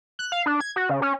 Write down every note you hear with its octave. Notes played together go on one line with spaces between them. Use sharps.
F#6
F5
D4
G#6
F#4
C#3
C#4